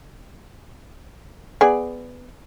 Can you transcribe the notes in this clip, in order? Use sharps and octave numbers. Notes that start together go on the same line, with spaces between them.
B3 G#4 D5